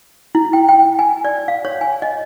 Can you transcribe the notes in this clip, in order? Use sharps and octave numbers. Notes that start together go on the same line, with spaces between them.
E4
G5
G5
G#5
D5
F5
C#5
G#5
D#5